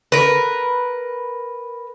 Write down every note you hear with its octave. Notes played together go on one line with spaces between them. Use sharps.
A#4 B4